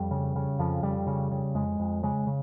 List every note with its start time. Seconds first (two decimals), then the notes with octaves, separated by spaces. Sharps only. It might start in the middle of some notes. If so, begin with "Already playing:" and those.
Already playing: F2 G3
0.11 C#3
0.36 C#3
0.59 F2 F3
0.82 F2 G3
1.07 C#3
1.31 C#3
1.54 F2 G#3
1.79 F2
2.03 C#3 G#3
2.27 C#3